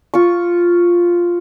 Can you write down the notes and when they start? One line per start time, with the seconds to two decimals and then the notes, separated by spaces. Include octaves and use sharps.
0.14 F4 C#6